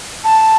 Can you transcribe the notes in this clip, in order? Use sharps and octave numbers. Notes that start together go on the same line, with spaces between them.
A5